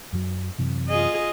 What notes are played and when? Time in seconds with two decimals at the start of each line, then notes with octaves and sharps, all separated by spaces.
0.13 F#2 F#3
0.58 F#2 C3 E3
0.88 F4 G#4 D#5